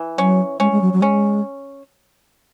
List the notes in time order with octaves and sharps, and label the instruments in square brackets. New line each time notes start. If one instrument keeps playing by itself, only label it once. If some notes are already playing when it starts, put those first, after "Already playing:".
Already playing: [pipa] E3
[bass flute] F#3 [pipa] C#4
[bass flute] G#3 [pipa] C#4
[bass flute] G#3
F#3
F#3
[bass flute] G#3 [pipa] C#4